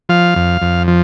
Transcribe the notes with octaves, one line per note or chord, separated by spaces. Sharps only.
F3 F5
F2
F2
F3